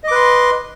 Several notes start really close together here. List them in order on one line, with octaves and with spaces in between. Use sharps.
D#5 D6 B4 C6